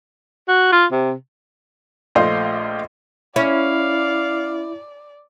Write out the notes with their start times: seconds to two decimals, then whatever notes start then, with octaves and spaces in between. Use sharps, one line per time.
0.48 F#4
0.72 F4
0.91 C3
2.15 A#1 A3 F4 C5 D#5 F5
3.36 C#4 E4 D5 F5